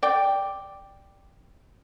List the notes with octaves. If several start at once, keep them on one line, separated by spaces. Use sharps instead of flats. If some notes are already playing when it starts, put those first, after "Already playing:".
D5 G5